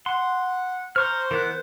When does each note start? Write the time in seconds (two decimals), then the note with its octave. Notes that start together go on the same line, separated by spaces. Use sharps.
0.06 F#5 C6
0.96 C5 A#5 C#6 F6
1.31 E3 B3 A#4 F#6